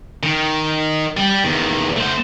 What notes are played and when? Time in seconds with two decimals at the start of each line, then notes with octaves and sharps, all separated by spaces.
0.23 D#3
1.17 G3
1.44 E2 D#3
1.97 A3 C5